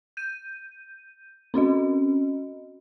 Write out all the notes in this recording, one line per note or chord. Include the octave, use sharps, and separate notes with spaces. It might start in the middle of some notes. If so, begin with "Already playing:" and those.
G6 D#7
C4 C#4 F#4 D#5